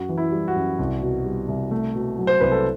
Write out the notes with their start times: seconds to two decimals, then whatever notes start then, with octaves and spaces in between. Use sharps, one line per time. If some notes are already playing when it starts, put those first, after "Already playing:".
Already playing: F#2 F#4
0.09 E3
0.18 E4
0.32 G3
0.48 F#4
0.56 F#2
0.79 C2
1.02 B2
1.26 G3
1.48 C2
1.71 A3
1.95 B2
2.19 F#3
2.27 C5
2.40 C2 B4
2.52 A4